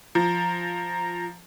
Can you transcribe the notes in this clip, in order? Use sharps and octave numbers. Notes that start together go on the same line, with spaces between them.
F3 A#5